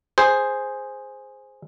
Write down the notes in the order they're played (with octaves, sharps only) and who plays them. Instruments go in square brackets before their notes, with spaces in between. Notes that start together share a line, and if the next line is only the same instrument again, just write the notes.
[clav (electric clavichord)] G#4 C5